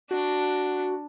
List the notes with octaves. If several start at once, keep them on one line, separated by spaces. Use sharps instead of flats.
D4 F#4